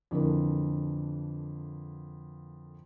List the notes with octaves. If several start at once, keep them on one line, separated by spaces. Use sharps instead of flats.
F2 D3 E3 A#3